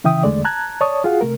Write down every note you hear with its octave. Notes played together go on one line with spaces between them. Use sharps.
C#3 E3 E5 G5 D#6
E2 D3 G#3 A3 D5
A5 A#5 F#6 G#6
C#5 D5 A5 C#6 D#6
F4 F#4 G#4 F5 F#5
C3 A3 A#4